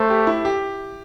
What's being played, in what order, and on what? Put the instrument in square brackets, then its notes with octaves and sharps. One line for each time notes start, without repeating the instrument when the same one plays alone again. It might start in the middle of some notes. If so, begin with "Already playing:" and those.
Already playing: [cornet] A3 [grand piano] C5 E5
[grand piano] G4
E4
G4